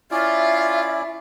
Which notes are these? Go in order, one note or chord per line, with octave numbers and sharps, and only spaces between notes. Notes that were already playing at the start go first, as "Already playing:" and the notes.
C#4 E4 F4 D5 E5